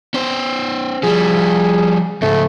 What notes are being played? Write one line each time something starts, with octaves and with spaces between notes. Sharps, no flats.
C#4 C5
F3 G3 G#4
G#2 C#3 A3